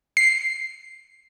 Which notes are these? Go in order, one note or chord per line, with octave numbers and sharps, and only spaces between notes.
C7